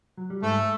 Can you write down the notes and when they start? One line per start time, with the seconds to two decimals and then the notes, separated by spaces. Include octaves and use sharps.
0.18 F#3
0.30 G3
0.43 G#2 G#3 A3 A4